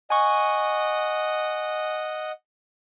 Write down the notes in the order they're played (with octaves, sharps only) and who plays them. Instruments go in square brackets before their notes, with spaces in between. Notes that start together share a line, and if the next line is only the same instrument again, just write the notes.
[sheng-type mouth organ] D#5 F#5 [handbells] G#5 C#6